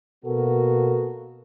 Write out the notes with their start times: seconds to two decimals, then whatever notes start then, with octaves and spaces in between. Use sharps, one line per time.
0.25 B2 A#3 B3 F#4 A4 A#4